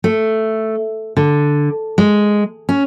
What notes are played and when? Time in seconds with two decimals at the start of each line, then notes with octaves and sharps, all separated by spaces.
0.04 A3
1.17 D3
1.98 G#3
2.69 C#4